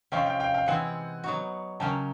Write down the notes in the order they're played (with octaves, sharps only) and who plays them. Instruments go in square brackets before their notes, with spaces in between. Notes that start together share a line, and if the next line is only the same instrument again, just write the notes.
[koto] C3 F3 G#3 C#4 [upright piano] F5 G5
[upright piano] F5 G5
F5 G5
F5 G5
[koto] E3 G#3 C4 E4 [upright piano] F#5 G#5
[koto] F#3 B3 D#4 F#4
[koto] C#3 F#3 A#3 C#4 [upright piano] G5 A5